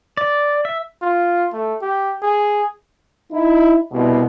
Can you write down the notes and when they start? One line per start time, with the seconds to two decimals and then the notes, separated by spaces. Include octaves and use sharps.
0.17 D5
0.65 E5
1.02 F4
1.53 A3
1.82 G4
2.22 G#4
3.32 D#4 E4
3.92 C2 B2